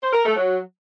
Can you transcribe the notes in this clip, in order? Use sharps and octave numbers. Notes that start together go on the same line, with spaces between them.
C5
A#4
A3
F#3